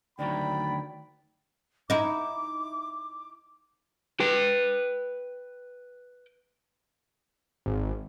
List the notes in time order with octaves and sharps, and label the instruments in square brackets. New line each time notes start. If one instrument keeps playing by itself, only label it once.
[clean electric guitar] D2 D#3 F#3 [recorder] D5 [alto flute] G5 [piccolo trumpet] B5
[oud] D#4 E4 [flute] D6
[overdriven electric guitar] B4 G5
[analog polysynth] G#1